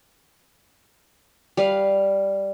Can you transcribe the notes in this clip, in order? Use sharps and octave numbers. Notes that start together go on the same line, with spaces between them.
G3 B4 F5